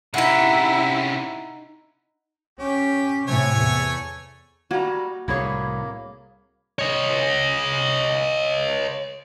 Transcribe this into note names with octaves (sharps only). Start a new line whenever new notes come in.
C3 C#4 D#4 E4 F#5
C#4 G4
A2 C3 A3 C#5 G#5
E2
G3 A#3 F#4 A#5
C2 A2 A#3 E4 G#4 C#5
C#5 D#5